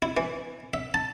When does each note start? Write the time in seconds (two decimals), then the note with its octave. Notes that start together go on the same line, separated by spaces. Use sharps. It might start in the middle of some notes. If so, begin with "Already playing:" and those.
0.02 E4
0.17 E3
0.74 E5
0.94 A5